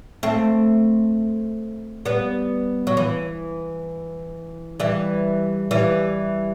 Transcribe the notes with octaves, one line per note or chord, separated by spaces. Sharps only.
A3 C4
G3 B3
F#3
E3
E3 G3
E3 G3